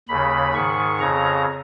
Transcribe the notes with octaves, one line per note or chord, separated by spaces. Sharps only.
D#2 C#3 B5
G#2 D#3 C#6
F2 C#3 A#5